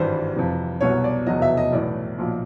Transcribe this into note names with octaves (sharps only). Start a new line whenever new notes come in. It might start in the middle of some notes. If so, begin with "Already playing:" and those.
Already playing: G#1 G2 E3 G3 C5
F2 C3 E3
C2 B2 F#3 C#5
D5
F1 E2 B2 F#3 D#5
E5
D#5
B1 A2 E3 D5
B1 A#2 F3